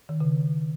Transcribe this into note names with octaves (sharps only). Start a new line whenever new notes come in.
D#3
C#3